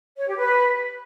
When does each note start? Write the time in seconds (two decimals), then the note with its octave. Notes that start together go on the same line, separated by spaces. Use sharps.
0.17 C#5
0.27 G4
0.38 B4